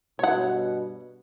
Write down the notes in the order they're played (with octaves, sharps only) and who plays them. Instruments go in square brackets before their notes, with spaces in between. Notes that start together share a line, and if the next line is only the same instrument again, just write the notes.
[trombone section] G2 B2 [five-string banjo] C#5 F#5